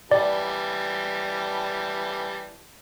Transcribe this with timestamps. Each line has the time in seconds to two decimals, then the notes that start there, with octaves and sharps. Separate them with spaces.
0.11 E3 G3 D5 A5